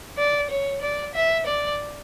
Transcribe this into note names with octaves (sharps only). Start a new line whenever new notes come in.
D5
C#5
D5
E5
D5